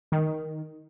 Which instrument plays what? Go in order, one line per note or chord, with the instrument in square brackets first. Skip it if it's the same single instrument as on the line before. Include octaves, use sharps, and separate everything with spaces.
[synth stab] D#3